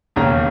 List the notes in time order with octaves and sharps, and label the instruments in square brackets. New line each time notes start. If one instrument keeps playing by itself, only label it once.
[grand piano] E1 D#2 C#3 A#5